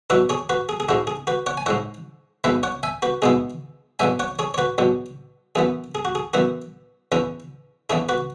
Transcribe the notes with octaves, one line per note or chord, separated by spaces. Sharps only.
B2 F#3 E4 F#4 B4
G#4 C#5
F#4 B4
G#4
G#4
G#2 G#3 E4 F#4
G#4
F#4 B4
C#5 F#5
G#5
G#2 G#3 E4 C#5 F#5
B1 B2 G#3 B3 E4 B4 E5
C#5 F#5
E5 G#5
F#4 B4
B1 B2 G#3 B3 E4 G#4
E2 B2 F#3 E5 G#5
C#5 F#5
G#4 C#5
C#5
F#4 B4
E2 B2 F#3
F#2 E3 B3 G#4
G#4
F#4
G#4
F#2 E3 B3 F#4
E2 E3 C#4 E4
E2 E3 C#4 E4 G#4
F#4 B4